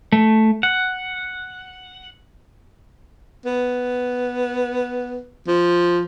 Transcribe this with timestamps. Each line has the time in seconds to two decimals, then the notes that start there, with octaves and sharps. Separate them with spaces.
0.12 A3
0.63 F#5
3.46 B3
5.47 F3